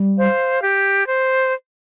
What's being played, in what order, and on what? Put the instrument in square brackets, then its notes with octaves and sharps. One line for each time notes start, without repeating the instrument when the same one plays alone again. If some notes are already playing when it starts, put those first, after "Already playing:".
Already playing: [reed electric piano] G3
[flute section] C5 F5
G4
C5